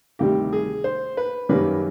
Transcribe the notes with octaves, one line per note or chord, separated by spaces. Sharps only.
D2 C3 D#3 G3 G4
G#4
C5
B4
F#2 D#3 G3 A#3 C#4 B4